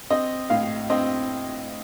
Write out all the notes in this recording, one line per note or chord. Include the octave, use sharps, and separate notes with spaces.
C4 D#5
A2 F5
C4 D#5